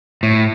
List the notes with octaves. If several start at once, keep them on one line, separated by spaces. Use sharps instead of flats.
A2